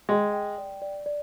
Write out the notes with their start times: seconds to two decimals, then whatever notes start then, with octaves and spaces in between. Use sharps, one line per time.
0.09 G#3 G5
0.33 G5
0.58 D5
0.82 D5
1.06 D5